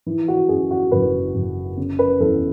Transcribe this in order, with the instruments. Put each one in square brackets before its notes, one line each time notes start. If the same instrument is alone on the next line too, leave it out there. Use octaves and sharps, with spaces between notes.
[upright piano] E3
F#4
F#2 G#4
F#4
F#1 B4
F#1
C#3
B4
E2 A4